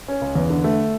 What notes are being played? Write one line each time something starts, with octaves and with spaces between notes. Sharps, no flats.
C#4
C#2
E2
D3
A3